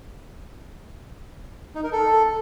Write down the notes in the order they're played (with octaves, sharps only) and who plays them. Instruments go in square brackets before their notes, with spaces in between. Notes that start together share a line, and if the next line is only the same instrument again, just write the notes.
[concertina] D#4
A#4
A4